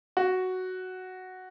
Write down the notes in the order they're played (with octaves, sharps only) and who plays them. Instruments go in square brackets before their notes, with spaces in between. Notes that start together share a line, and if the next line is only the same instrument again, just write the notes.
[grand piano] F#4